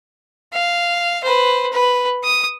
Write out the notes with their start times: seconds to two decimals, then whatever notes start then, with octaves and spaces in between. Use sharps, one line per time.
0.53 F5
1.24 B4 C5
1.73 B4
2.24 D#6